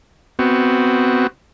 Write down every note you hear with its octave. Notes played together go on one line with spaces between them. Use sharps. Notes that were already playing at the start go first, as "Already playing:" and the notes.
B3 C4 F#4